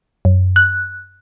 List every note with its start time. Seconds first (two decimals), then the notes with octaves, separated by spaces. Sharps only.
0.25 F#2
0.56 F#6